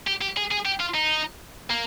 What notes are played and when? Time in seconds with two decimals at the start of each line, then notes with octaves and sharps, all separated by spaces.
0.07 G4
0.21 G4
0.37 G#4
0.51 G#4
0.65 G4
0.80 F4
0.95 D#4
1.70 A#3